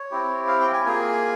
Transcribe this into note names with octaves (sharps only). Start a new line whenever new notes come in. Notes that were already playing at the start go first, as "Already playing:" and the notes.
Already playing: C#5
C4 E4 G4
F5
G5
G#5
A#3 F4 G#4 G#5